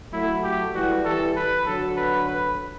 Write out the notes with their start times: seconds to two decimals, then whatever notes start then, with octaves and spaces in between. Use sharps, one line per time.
0.13 F#3 A3 E4
0.43 G4
0.74 E3 G3 F#4
1.04 E3 G3 A4
1.36 B4
1.65 D3 F#3 A4
1.96 B4
2.27 B4